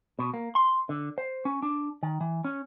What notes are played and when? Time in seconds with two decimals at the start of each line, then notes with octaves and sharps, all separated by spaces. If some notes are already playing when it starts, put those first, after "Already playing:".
0.19 B2
0.34 A#3
0.55 C6
0.89 D3
1.18 C5
1.45 C#4
1.63 D4
2.03 D#3
2.21 E3
2.44 C#4